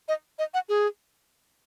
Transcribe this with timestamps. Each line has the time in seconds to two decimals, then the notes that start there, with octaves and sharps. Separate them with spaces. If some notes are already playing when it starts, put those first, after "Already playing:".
0.08 D#5
0.39 D#5
0.54 F#5
0.69 G#4